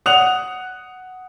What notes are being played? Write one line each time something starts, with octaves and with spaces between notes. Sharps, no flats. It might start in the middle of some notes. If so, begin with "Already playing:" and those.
F#5 D#6 F#6 F7